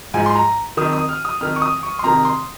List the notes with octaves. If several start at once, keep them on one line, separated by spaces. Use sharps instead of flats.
G#2 F3 G#5
C6
A#5
F2 D#3 D#6
D#6
F6
D#6
F2 D#3 F6
C#6
D#6
C#6
C6
F2 C3 D#3 A#5
C6